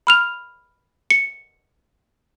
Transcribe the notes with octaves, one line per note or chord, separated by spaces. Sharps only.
B5 F6 F7
C#7